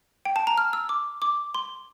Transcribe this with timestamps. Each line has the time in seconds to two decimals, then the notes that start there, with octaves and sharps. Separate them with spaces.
0.25 G5
0.36 A5
0.47 A#5
0.58 F6
0.73 E6
0.89 D6
1.22 D6
1.54 C6